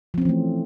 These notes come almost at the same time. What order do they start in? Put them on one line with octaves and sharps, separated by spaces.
F3 C4 C#4 E3 A3